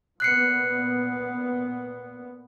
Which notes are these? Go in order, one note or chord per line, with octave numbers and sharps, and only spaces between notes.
A#2 B3 F#6 C7 C#7